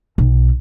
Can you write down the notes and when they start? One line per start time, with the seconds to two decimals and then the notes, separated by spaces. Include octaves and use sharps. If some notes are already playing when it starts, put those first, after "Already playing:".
0.18 B1